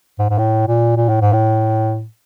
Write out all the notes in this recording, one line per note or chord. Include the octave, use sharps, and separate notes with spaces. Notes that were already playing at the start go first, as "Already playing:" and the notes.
G#2
G#2
A2
A#2
A#2
A2
G#2
A2